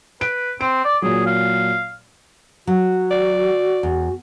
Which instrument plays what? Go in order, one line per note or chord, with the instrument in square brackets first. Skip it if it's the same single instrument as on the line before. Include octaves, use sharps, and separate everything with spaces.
[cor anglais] B4 [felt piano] D7
[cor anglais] C4 [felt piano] D7
[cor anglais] D5
[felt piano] A#2 F#3 [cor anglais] G#4
[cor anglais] F5
[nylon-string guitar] F#3 [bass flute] F#4
[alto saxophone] D5
[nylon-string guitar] E2